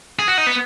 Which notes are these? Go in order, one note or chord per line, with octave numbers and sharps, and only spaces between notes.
G#4
F#4
D#4
B3